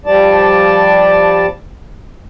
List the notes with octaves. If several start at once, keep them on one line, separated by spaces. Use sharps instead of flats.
F3 G3 D5 A5